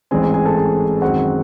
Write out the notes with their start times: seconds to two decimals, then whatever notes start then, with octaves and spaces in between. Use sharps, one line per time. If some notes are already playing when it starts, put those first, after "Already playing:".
0.11 A1 G#2 E3 C4 G#4 G#5
0.22 G#4 G#5
0.34 G#4 G#5
0.45 A4 A5
0.56 G#4 G#5
1.02 F#2 D#3 G#3 C4 F#4 F#5